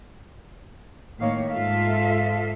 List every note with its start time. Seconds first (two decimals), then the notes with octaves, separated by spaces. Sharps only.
1.20 A2 D#3 A#3 C#5 F5
1.51 G#2 F4 A4 E5 F5